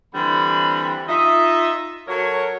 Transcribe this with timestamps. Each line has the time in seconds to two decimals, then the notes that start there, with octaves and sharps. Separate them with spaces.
0.14 D3 E3 G3 C4 B5
1.08 D#4 F4 D#5 E5
2.07 F#3 A4 A#4 C#5